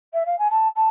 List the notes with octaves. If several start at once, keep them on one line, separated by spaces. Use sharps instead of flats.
E5
F5
G#5
A5
A5